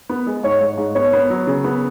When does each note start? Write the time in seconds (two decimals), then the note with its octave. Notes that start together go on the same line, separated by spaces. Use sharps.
0.09 B3
0.27 G#3
0.43 G#2 C#5
0.61 G#2
0.78 G#2
0.95 B3 C#5
1.13 B3
1.30 F#3
1.47 C#3
1.64 B3